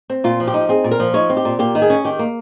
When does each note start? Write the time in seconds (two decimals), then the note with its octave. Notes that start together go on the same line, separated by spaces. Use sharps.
0.10 C4
0.24 A#2 F4
0.40 F3
0.47 G4
0.54 D#4
0.69 C4 G#4
0.84 A#2
0.91 A#4
1.00 F3
1.14 D#4 C#5
1.30 C4
1.37 G4
1.45 A#2
1.59 A#3 G4
1.75 D#3
1.82 G#4
1.90 C#4
2.05 D#3 G4
2.19 A#3